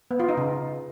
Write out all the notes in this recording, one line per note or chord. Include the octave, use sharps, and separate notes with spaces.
B3
F4
D#4
C#3